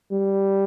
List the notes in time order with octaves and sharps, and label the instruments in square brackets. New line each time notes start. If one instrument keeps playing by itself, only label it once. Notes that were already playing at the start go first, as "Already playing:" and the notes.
[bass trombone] G3